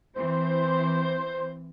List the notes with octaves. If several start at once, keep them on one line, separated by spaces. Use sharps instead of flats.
E3 C4 C5